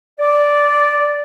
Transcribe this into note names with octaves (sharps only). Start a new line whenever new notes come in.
D5